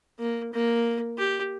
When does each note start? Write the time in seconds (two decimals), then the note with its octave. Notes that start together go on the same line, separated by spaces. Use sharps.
0.19 A#3
0.53 A#3
1.18 G4